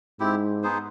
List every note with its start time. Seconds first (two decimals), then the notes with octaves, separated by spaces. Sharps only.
0.20 G#2 C4 E4 G4
0.63 B3 D#4 G#4 C5